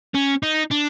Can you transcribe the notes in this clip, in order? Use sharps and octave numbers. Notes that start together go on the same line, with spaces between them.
C#4
D#4
D4